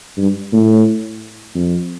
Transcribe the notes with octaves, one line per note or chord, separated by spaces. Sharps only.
G2
A2
F2